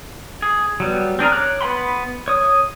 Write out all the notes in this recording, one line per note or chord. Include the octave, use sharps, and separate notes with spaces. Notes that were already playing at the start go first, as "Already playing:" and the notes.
G#4
F#3 G3 B3
C4 D4 G#4 A#4
C#5 D6 F#6
B3 B4 G5 B5 C6
C#5 D#6